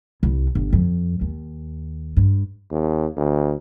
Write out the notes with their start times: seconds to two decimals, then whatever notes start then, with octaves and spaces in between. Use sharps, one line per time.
0.23 C2
0.55 G1
0.73 F2
1.21 D#2
2.17 G2
2.71 D#2
3.17 D2